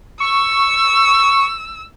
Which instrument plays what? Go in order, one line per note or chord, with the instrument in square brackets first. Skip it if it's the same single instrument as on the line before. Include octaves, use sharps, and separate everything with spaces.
[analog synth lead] C#6 [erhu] E6